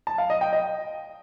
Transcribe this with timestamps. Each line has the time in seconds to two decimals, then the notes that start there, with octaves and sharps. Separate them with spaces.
0.07 A5
0.18 F5
0.30 D#5
0.41 G5
0.53 D#5